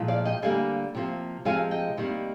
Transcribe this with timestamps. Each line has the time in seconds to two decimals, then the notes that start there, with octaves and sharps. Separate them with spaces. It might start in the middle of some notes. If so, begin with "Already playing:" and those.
Already playing: A#2 F3 G#3
0.08 D5 F5
0.25 D#5 G5
0.42 D3 G3 A#3 F5 G#5
0.95 C3 F3 A#3
1.45 C3 F3 G#3 F5 G#5
1.71 D#5 G5
1.97 C3 D#3 G3 A#3